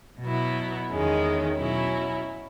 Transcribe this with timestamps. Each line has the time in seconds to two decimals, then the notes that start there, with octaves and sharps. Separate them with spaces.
0.21 B2 F#3 B3 E4
0.89 E2 D#3 G#3 C#4
1.58 B2 F#3 C#4 E4